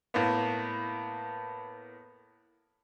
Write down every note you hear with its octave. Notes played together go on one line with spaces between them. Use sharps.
A2 A#3 B3